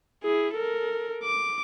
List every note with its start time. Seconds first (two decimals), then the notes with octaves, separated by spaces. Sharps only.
0.23 E4 G#4
0.54 A4 A#4
1.24 D6